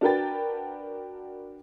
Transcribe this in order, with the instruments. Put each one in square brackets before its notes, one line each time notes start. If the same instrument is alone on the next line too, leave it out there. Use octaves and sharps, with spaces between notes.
[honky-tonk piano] D4 F#4 A#4 B4 G5 A6